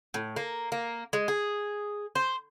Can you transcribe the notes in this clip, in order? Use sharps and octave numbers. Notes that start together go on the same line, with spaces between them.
A2
A#3
A#3
G#3
G#4
C5